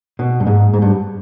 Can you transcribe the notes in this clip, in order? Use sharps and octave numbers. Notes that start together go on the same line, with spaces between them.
B2
G2
G#2
G#2
G2